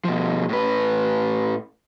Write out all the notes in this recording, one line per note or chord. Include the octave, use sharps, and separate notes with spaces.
B2 F3
A2 B4